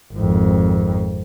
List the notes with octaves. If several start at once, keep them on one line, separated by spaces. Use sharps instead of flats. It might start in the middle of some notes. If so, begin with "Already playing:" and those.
G#1 F2